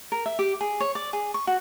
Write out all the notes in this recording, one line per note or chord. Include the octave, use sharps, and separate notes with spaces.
A#4
E5
G4
G#4
C#5
D5
G#4
C#6
F#4